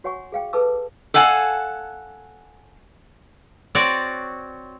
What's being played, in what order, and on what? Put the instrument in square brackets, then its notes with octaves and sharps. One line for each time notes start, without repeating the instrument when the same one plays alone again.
[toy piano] F#4 C#5 F#5 G#5 C#6
G#4 F5 G5
G#4 A4 B4 A5 D6 E6
[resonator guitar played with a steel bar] A4 F5 F#5 G#5 A5
[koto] C4 F#4 C#5 D5